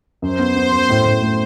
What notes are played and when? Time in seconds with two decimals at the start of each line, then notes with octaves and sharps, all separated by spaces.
0.22 F#2 C5
0.39 B3
0.56 B3
0.72 F#2
0.89 A2
1.06 A2
1.22 A3